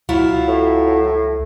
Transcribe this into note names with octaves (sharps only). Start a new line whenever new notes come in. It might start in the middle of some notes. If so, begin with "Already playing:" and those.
C#2 F#3 E4 F4
A2